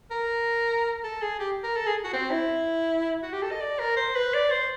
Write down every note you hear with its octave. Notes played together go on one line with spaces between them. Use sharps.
A#4
A4
G#4
G4
A#4
A4
G#4
F#4
C4
E4
F#4
G4
A4
D#5
D5
A#4
C5
B4
D5
C5